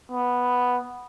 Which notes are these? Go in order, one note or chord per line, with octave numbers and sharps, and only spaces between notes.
B3